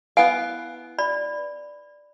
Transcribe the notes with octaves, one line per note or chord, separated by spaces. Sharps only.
B3 E4 F5 G#5
D5 B5